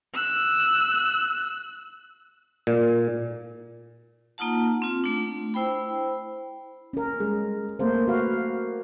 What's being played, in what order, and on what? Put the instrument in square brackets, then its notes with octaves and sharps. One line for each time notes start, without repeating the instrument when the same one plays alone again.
[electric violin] E6 F#6
[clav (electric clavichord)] A#2
[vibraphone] A#3 D#4 F4 F#5 A5
C4 F4
A3 D4
E4 C5 G5 B5
[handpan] C#4 A#4
[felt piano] G#3
[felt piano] A3 A#3 A#4 [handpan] C5
[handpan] F#4 B4 F5